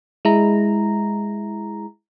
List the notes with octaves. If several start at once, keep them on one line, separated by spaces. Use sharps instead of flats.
G#3 E4 A#5